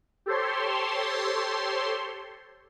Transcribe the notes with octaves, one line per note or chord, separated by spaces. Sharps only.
G4 A4 C5 C#5 C6